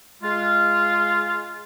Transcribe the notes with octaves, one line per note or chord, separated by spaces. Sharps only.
G#3 F4